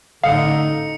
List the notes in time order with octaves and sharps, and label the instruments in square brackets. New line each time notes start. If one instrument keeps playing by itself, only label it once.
[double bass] A1 D#4 [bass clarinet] D3 [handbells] F5 [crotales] D#6 C#7